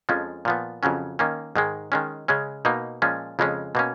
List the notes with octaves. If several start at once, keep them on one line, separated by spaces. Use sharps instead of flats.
F2 F3 G#3 C#4
A#2 F3 B3
F2 C#3 F#3 C#4
D#3 A#3 C#4
G#2 D#3 G#3
D#3 G#3 C#4
C#3 G#3 C#4
B2 A#3 D#4
A#2 F3 G#3 C#4
F2 C#3 G#3 C#4
B2 A#3 C#4